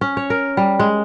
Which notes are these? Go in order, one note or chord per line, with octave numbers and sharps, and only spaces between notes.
C#4
C#5
A#4
G3
G#3